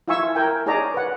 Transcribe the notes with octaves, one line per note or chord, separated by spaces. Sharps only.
E4 F4 E5 G#5 C#6 E6
A#4 G5 G#5
D#4 G#4 C#5 D5 A#5
B4 F#5